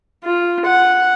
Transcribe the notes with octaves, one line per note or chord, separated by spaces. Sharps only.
F4
F#5